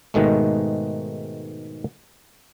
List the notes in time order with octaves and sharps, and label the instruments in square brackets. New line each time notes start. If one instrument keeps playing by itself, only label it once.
[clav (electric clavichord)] G#2 B2 D#3 G#3 A3